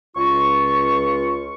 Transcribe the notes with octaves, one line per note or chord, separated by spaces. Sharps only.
C#2 F4 C#6